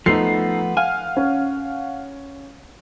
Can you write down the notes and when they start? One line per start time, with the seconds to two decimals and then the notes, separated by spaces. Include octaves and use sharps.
0.06 F3 A3 B3 D#4 A4 C7
0.77 F5 F#5 G#5 F6
1.17 C#4